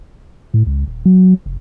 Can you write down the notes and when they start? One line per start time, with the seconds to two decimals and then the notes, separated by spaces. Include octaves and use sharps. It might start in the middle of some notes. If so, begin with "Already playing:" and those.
0.54 A2
0.66 C#2
0.87 D#1
1.05 F#3
1.46 F1